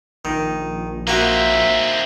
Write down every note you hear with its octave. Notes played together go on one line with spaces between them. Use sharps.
A#1 D#3
A#3 C4 D#4 F#4 E5